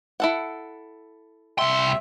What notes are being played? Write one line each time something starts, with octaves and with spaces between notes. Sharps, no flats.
E4 A4 F#5
C2 E5 C6